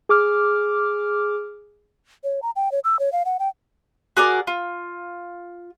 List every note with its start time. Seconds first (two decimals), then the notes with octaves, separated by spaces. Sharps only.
0.09 G#4 D6 F6
2.24 C#5
2.43 A#5
2.56 G5
2.72 C#5
2.84 E6
2.99 C#5
3.12 F5
3.25 F#5
3.39 G5
4.17 F#4 G#4 A#4 D5
4.47 F4